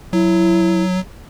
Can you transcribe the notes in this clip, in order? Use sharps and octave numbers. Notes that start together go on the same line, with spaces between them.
F#3 E4